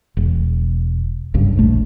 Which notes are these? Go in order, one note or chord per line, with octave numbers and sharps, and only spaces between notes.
E1
F#1 C#2 G2
E1 A#1 A3